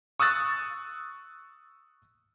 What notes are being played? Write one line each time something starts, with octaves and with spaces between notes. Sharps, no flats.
C#6 D#6 E6 F#6 A6